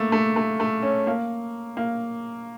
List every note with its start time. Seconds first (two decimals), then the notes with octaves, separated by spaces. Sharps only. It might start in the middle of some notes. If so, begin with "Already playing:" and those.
Already playing: A3 A#3
0.12 A3
0.36 A3
0.60 A3
0.82 C#4
1.07 A#3
1.77 A#3